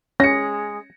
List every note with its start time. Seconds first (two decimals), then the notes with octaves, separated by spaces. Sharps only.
0.20 G#3 C#4 A#6 C#7